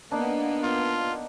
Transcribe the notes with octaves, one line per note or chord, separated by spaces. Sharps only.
A#3 B3 D4 D#4
F4